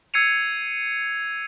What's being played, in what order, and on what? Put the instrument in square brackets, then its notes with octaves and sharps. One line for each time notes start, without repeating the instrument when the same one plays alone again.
[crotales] E6 G#6 C7 C#7 D#7 F7